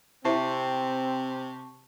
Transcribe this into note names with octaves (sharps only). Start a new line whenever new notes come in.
C3 C4 E4 C5 E5 A5 C#6 C7